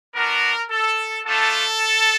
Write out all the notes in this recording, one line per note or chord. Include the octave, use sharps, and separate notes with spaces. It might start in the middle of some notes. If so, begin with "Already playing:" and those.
B3 D4 F#4 A#4
A4
A3 D4 F4 A4